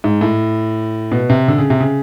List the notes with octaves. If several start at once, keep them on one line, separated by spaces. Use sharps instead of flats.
G#2
A2
B2
C3
D3
C#3
C3
C#3